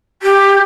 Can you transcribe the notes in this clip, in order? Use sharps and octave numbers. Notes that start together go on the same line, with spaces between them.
G4